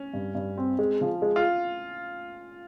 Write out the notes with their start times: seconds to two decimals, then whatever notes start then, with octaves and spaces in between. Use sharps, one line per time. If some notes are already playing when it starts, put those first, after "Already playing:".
Already playing: C#4
0.14 G2
0.35 G2
0.57 C4
0.79 G#3
1.01 F3
1.22 G#3
1.36 F4